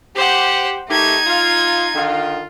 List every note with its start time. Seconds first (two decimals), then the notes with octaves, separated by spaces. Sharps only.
0.16 G4 C5 F#5
0.90 D#3 A3 D#4 G4 G#6
1.27 F4
1.95 D3 D#3 F4